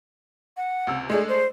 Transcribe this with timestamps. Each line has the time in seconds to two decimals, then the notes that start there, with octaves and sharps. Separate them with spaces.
0.57 F#5
0.87 C#2 C3 E6
1.10 G#3 A3 D4 G#4
1.28 C5